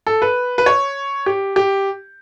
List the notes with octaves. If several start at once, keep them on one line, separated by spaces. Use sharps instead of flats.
A4
B4
B4
C#5
G4
G4